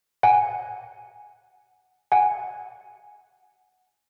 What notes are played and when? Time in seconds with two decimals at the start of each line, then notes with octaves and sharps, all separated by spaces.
0.23 F#5 G#5
2.12 F#5 G#5